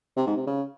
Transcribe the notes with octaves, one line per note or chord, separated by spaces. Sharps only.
C3
G#2
C3
C#3